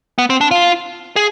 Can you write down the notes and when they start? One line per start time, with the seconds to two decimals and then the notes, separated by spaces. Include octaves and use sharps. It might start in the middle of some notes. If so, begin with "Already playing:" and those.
0.18 B3
0.30 C4
0.41 D4
0.51 F4
1.16 G#4